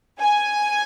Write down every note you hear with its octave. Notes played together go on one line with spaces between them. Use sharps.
G#5